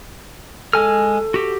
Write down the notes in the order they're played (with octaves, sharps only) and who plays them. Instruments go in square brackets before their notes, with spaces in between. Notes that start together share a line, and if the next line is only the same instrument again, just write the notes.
[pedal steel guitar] G#3 G#5 F6 [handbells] A4
[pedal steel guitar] F#4 G4